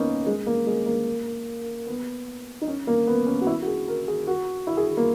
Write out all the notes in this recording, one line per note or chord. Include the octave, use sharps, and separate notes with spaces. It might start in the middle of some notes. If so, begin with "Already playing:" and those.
Already playing: A#3 B3 C#4 D#4
G#3
A#3
G#3
A#3
B3
D#4
C#4
A#3
B3
C#4
F#4
E4
F#4
G#4
A#4
G#4
F#4
E4
G#4
G#4
A#3